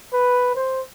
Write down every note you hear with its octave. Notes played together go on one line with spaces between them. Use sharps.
B4
C5